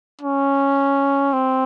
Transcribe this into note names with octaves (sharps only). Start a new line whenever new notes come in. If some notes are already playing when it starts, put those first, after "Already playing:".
C#4
C4